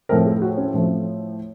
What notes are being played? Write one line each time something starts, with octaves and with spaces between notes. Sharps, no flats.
A2 F3 A3 C4 A#4
G#4
F#4
C#4
A2 F3 A3 C4